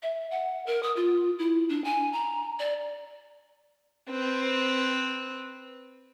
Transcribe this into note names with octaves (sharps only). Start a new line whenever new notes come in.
E5
F#5
A#4
D#6
F4
E4
D4
G#5
A#5
D5
C4 B4